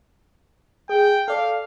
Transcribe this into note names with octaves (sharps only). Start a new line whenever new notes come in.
G#4 G5
A4 D5 F5